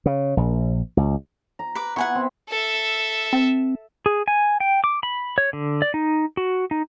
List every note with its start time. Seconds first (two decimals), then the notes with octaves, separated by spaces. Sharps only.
0.06 C#3
0.37 A#1
0.97 C#2
1.59 A#5
1.75 B4 D6
1.96 B3 E4 F#5 G#5 C#6
2.15 C4
2.49 A4 E5
3.33 C4
4.06 G#4
4.28 G#5
4.60 G5
4.84 D6
5.03 B5
5.38 C#5
5.53 D3
5.82 D5
5.94 D#4
6.37 F#4
6.71 D#4